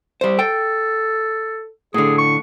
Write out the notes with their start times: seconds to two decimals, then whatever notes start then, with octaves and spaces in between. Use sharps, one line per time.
0.21 G3 C5
0.39 A4 G5
1.94 A2 D3 G#4
2.18 C#6